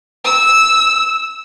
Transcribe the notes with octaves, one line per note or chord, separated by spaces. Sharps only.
E6